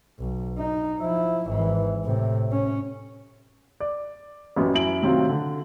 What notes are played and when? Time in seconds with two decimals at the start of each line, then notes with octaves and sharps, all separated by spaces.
0.19 B1
0.58 D#4
0.99 F3 E4
1.47 G#1 E3
2.05 A2 C3
2.51 C#4
3.80 D5
4.56 A1 F#2 B3
4.75 F#2 E4 D7 F#7
5.02 A2 C3 D#3 F#3 C4 F4
5.29 D3